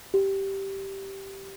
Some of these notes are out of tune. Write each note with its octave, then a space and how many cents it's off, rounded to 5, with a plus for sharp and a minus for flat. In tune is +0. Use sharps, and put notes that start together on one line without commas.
G4 -10